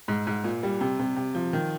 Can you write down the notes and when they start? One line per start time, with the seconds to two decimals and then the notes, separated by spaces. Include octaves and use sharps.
0.08 G#2
0.27 G#2
0.44 A#2
0.63 G3
0.81 C3
0.99 C3
1.16 C3
1.35 F3
1.53 D#3